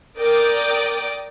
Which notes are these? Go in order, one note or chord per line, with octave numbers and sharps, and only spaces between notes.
A#4 D5 G5 D6 D#6